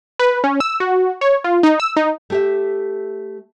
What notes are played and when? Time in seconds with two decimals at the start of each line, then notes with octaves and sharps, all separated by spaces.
0.19 B4
0.44 C#4
0.60 E6
0.80 F#4
1.21 C#5
1.44 F4
1.63 D#4
1.80 E6
1.97 D#4
2.30 A3 G4 E5